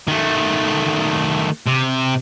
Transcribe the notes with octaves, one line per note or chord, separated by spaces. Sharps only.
D#3 A3
C3